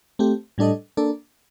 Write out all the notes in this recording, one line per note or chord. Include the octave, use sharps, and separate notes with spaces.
A3 C4 G4
A2 G3 D4 A4 D#5
A#3 D4 A4 D5